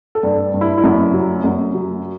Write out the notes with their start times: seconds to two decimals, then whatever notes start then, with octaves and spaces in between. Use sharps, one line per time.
0.15 A4
0.23 G2
0.54 G2
0.61 E4
0.78 E4
0.84 F#2
1.14 F#3
1.44 F#2
1.74 F#3